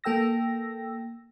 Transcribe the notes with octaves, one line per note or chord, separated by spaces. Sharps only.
A#3 A4 G5 E6 A#6